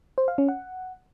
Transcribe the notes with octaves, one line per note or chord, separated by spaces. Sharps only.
C5
F5
C#4
F#5